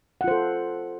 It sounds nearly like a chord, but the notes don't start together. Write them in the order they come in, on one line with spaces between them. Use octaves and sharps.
F#5 F4 C5 A4